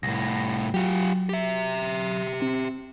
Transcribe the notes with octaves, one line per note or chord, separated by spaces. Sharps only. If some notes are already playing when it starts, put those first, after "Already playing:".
C2 A2 A#6
F#3 F4 G4
G4 E5
C4